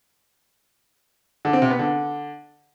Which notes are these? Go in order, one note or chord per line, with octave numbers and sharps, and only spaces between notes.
D3
C4
C3
B3
D3